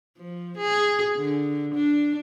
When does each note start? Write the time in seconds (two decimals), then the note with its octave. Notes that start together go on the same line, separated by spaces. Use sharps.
0.18 F3
0.57 G#4
1.17 D3
1.75 D4